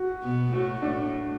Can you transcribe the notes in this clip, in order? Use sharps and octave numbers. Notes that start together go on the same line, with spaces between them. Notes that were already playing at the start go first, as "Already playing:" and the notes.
Already playing: F#4
B2 B3
A2 A3 F#4
A2 A3 D4